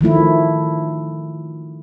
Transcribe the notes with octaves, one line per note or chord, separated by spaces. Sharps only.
D#3 F3 A3 E4